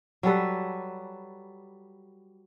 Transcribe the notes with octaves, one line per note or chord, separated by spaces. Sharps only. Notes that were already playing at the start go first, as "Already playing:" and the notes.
F#3 G3 A4 B4